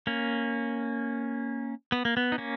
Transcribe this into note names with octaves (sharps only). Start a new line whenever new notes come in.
A#3 C#4
B3
A#3
B3
D#4
A#3 C#4